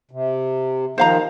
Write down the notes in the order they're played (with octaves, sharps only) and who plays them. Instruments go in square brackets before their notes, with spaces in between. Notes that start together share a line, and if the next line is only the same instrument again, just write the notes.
[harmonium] C3
[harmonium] D#3 F3 D#4 [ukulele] C5 F5 A#5